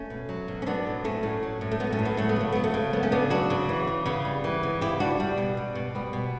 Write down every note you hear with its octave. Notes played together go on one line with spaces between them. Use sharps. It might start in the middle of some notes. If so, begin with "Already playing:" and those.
Already playing: A3 C#4
B2
F#3
B2
C#4
F#3 B3 D4
A2
F#3 A3 C#4
A2
F#3
A2
A3
F#3 B3
A3 C#4
A2
B3
F#3 A3
B3
C#3 A3
F#3 B3
A3
C#3
F#3 B3
A3 C#4
C#3 B3 D4
F#3 D4 F#4
C#3
E3
C#3
C#3 B3
G3
E3
C#3
C#3 E4 G4
G3 D4 F#4
G3
B2
G3
B2
G3 B3
B2